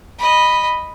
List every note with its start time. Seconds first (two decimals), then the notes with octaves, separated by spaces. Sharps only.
0.18 D#5 B5